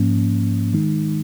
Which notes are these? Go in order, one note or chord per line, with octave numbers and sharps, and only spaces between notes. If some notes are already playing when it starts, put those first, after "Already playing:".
Already playing: G#2 F3 A#3 C#4
D#3 G#3 D#4